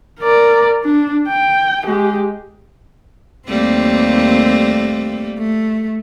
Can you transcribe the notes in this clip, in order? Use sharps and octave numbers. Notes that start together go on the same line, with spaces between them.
A#4 D5
D4
G5
G#3 G4
D#2 G3 A3 A#3 C4
A3